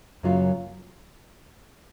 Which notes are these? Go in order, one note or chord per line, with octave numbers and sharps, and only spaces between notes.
F#2 C#3 F#3 A#3 F4